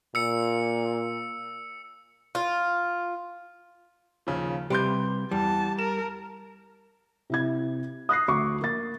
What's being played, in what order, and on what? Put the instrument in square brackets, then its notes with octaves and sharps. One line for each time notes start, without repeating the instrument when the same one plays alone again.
[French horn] A#2 [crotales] E6 C#7
[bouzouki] F4
[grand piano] D#2 C#3 F3
[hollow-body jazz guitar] C3 G3 G4 [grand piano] B4 C6 G6
[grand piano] E2 [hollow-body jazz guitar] G3 [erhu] A5
[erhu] A#4 [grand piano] E7
[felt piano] C3 E4 G#6
D#6 F#6 A#6 C7
D2 C#6 D6
A#3 A6